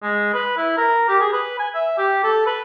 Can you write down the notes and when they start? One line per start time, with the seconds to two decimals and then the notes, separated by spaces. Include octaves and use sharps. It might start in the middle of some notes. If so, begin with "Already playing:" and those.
0.02 G#3
0.34 B4
0.57 E4
0.77 A#4
1.09 G4
1.20 G#4
1.33 B4
1.59 G#5
1.74 E5
1.98 G4
2.24 A4
2.46 B4